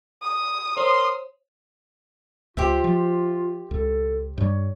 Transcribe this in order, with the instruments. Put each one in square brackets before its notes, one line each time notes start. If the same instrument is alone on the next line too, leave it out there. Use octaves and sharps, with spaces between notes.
[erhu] D#6
[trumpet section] A#4 C6 [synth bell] C5 C#5
[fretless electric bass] C#2 [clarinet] F4 [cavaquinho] G4 C5 E5
[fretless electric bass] F3
[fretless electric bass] C#2 [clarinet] A4
[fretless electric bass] G2 G3 [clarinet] C#5